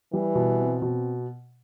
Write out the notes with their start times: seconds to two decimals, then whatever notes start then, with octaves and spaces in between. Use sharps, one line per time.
0.12 E3 G3
0.35 B2
0.60 C4
0.82 B2